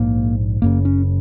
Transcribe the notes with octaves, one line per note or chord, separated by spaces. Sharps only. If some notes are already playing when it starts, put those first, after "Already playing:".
Already playing: A#1 G#2 A#3
F#1 F#2 C#3 A#3
C#4